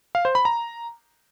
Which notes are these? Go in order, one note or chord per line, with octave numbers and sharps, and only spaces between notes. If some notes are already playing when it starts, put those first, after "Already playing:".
F5
C5
B5
A#5